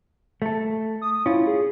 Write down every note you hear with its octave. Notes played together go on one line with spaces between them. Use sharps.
A3 A4
D#6
C#4 E4 F4
G#4